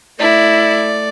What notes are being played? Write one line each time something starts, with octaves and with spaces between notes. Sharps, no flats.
A3 E4 D5